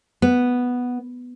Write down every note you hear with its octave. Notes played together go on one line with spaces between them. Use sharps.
B3